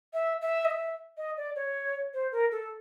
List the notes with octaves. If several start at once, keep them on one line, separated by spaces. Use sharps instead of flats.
E5
E5
D#5
E5
D#5
D5
C#5
C5
A#4
A4